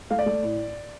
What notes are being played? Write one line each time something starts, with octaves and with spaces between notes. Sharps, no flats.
A3 F5
D5
A3
A2